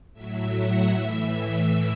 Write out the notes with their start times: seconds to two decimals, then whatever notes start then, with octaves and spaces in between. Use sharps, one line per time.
0.13 A2 F#3 E5
0.52 F#5
0.92 A2 E3 E5
1.31 E5